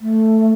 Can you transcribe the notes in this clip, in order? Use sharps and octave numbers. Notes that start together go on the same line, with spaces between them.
A3